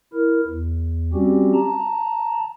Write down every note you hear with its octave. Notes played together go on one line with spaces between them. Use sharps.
E4 A#4
E2
G3 C4 C#4 F#4 G4
A5 A#5